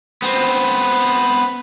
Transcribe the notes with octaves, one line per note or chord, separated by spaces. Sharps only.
B3 C4